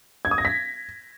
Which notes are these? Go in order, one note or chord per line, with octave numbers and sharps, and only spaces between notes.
G#6
D#6
A#6
B6